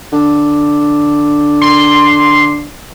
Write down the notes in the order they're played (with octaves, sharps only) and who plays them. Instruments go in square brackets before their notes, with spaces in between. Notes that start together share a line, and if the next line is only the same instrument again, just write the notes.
[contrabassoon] D3
[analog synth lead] C6